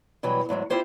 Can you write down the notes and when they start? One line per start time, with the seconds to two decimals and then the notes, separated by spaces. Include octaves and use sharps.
0.23 B2 E3 F#3 G3
0.49 E2 G#2 F#3 A3
0.70 C4 E4 F4 G4 C5 C#5